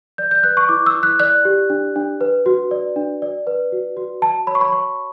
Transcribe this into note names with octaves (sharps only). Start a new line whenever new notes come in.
D5 G6
G6
B4 F#6
C#6
E4 D6
E6
E4
F#6
D5 F#6
G4
D4
D4
B4
F#4
D5
D4
D5
B4
F#4
F#4
F#4 A5
C#5 B5
C#6
B5
C#5 C#6